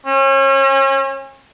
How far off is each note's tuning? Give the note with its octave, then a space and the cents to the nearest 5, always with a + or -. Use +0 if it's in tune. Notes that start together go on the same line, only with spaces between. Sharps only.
C#4 -35